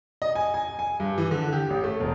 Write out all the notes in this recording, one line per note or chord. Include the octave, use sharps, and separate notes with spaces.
D#5
G#5
G#5
G#5
G2
E3
D3
G4
A1
A3
E1